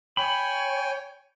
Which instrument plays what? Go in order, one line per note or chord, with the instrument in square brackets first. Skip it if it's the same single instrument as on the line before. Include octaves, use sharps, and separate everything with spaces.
[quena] C#5 [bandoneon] G5 G#5 [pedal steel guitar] B5